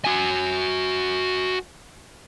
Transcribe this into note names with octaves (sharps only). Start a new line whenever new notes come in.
F#4 G#5